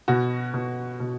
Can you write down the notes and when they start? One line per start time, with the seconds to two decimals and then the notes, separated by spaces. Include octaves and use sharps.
0.08 B2 F#4
0.54 B2
1.00 B2